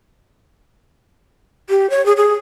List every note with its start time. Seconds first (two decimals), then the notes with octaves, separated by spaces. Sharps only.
1.69 G4
1.90 C#5
2.06 G#4
2.17 G#4